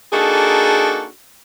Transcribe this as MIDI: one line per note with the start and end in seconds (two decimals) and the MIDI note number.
0.12 1.06 58
0.12 1.06 62
0.12 1.06 63
0.12 1.06 66
0.12 1.06 68
0.12 1.06 69